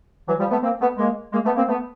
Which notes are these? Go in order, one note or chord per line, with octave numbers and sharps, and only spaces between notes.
E3 F#3
F3 G3
A3 B3
A#3 C4
A3 B3
G#3 A#3
G#3 A#3
A3 B3
A#3 C4
A3 B3